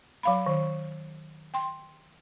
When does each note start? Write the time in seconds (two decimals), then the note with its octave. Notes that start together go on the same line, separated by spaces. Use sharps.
0.23 F#3 F5 B5
0.46 D#3
1.54 G5 C6